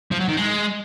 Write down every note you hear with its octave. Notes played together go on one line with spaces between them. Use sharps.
F3
F#3
D#3
G#3